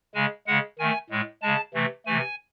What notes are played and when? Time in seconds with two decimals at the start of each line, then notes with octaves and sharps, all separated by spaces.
0.15 C#3 G#3 G#5
0.47 C#3 G#3 F#5
0.79 D#3 A3 G#5
1.10 A2 G#3
1.42 C#3 G#3 A5
1.74 C3 E3 A3
2.06 C3 E3 A3 G#5